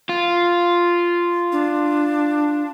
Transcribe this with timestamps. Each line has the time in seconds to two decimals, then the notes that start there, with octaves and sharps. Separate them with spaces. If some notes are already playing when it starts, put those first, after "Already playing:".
0.09 F4
1.52 D4